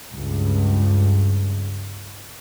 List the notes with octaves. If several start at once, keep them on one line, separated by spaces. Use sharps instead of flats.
C#2 G2